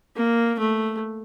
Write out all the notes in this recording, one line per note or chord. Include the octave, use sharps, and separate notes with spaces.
A#3
A3